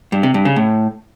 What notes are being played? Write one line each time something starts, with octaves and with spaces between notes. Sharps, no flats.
G2
C3
G2
C#3
A2